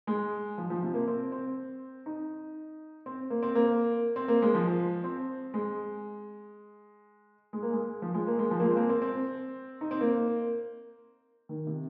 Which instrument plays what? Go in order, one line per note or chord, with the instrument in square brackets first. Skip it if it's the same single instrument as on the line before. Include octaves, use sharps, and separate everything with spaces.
[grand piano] G#3
F3
F3
C3
A#3
C4
C4
D#4
C4
A#3
C4
A#3
C4
A#3
G#3
F3
C4
G#3
G#3
A#3
G#3
F3
G#3
A#3
G#3
F3
A#3
G#3
C4
A#3
C4
C4
D#4
C4
A#3
D#3
C3